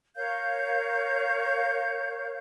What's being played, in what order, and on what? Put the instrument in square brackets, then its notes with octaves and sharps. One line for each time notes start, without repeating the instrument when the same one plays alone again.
[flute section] A#4 C#5 F5 G6